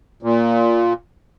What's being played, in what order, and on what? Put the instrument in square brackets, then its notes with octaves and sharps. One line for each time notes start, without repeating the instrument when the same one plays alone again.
[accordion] A#2